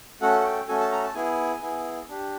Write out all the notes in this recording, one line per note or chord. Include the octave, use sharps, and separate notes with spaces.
A3 C#4 F#4 A4 F#5
F#5
G5
A3 C#4 F#4 A4 G#5
A5
A#5
A5
B3 E4 G#4 G#5
B3 E4 G#4
D4 G4